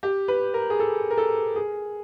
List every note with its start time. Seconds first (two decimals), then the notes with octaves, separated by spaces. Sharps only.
0.03 G4
0.28 B4
0.54 A#4
0.70 G#4
0.80 A4
1.11 A#4
1.18 A4
1.56 G#4